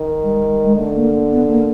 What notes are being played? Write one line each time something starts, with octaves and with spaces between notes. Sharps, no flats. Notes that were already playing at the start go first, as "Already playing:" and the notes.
Already playing: D#3
G3
G3
G3
G#3
D3 A3
A#3
B3
A#3